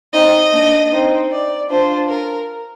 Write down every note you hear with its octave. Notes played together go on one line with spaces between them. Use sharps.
C4 D#4 D#5
A#3 D4
C4 D#4
D5
D4 F4 C5
A#4